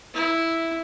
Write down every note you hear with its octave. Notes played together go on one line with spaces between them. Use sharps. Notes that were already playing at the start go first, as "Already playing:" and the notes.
E4